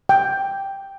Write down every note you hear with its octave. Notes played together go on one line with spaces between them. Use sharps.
G5